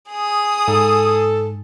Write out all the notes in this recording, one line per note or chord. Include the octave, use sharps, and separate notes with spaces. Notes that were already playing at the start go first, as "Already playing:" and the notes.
G#4 D#6
G#2 A4